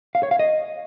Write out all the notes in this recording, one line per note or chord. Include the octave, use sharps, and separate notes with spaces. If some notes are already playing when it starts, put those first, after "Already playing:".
F5
C#5
F5
D#5